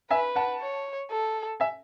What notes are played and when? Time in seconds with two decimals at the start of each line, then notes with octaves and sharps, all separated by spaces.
0.11 B4 E5 G#5
0.36 F#5 A5
0.61 C#5
1.11 A4
1.60 E5 G#5